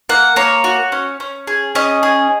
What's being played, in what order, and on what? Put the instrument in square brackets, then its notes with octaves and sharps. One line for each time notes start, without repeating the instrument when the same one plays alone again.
[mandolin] A#3 F#5
A#3 C#5
F#4
C#4
C#4
G#4
C#4 D#5
G#4